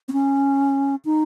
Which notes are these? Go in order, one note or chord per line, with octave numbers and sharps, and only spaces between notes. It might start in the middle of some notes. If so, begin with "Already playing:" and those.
C4
C#4
D#4